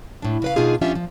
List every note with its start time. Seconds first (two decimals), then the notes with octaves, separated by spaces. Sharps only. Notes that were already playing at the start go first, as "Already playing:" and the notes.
0.22 A2 D4
0.42 C#3 B4 F5
0.56 B2 D4 D#4 F4 G#4
0.81 F3 C#4 D4 F4 G4 E5
0.95 F3